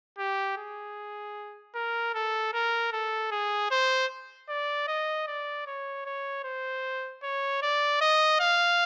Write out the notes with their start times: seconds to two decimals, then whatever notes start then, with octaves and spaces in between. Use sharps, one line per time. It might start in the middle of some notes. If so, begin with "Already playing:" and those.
0.19 G4
0.58 G#4
1.75 A#4
2.15 A4
2.54 A#4
2.93 A4
3.32 G#4
3.71 C5
4.49 D5
4.88 D#5
5.28 D5
5.67 C#5
6.06 C#5
6.44 C5
7.23 C#5
7.63 D5
8.01 D#5
8.41 F5